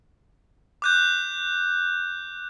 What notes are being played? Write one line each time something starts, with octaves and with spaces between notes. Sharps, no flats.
D6 F#6 G6